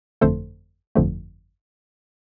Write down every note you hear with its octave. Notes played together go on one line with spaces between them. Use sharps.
G1 F2 D3 F3 A3 A4 C5
G1 F2 D3 F3 A3